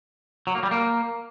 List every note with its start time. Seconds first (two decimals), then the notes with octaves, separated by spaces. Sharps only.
0.47 F#3
0.55 A#3
0.63 G3
0.71 A#3